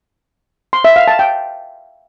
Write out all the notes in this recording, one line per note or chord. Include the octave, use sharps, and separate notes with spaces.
C6
E5
F5
A5
G5